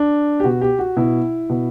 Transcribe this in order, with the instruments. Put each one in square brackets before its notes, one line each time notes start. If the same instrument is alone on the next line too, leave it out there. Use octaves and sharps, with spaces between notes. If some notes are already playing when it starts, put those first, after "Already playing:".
Already playing: [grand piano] D4
G4
B2 F#4
G4
F#4
B2 E4
B2